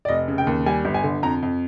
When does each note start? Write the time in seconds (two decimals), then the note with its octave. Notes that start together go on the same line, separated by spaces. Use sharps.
0.05 D5
0.08 F1 D#5
0.28 C#3
0.38 G5
0.47 D#2
0.66 G3 G#5
0.85 G1
0.94 G#5
1.04 D3
1.23 F2 A#5
1.43 F2